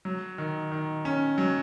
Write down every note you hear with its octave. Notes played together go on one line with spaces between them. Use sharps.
F#3
D#3
D#3
C#4
F#3